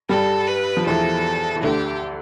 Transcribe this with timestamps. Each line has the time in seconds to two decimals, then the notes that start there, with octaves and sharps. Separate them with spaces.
0.09 G2 G3 A4
0.47 B4
0.77 F3
0.86 E2 E3 A4
1.56 E3
1.63 D2 D3 G4